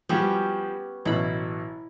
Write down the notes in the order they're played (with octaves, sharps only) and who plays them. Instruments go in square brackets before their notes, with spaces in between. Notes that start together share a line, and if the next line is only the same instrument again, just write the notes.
[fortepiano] F3 G3 F#4 [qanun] B3 C#4 G4
[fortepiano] A1 B2 F#3 [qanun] E4 B5